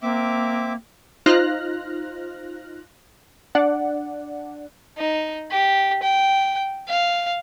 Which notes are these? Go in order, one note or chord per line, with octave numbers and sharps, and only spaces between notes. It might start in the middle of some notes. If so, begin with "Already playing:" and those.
A#3 C4 E5 D6
D#4 F4 C5 F6 F#6 A#6
D4 D5 F#5
D#4
G4
G5
F5